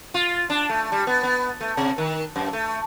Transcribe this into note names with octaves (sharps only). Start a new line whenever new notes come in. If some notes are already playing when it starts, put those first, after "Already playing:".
F4
D4
A3
G3
B3
B3
A3
C3
D#3
F#2
A3